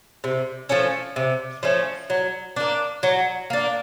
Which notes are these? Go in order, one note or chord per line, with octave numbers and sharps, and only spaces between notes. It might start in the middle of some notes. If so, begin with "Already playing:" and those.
C3
F3 A3 C#4
C3
F3 A3 C#4
F#3
A#3 D4
F#3
A#3 D4